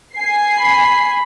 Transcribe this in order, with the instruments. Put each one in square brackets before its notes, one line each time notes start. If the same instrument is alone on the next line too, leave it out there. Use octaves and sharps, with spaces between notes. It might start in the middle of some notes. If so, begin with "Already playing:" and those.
[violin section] G#5 C7
[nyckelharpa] B5